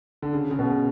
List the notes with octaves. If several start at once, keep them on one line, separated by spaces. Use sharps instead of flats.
D3
C#3
C#3
B2